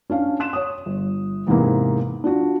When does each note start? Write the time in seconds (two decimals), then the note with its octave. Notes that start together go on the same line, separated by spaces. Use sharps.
0.10 C#4 D4 F5
0.40 C6 F#6 E7
0.53 C#5 D#6
0.86 G1
1.47 E2 G#2 C3 E3 A#3
2.24 D4 F4 F#4